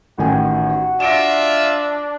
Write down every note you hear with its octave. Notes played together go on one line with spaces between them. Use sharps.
A1 D#3 F#4 G#5
D4 F4 E5 A#6 D7 E7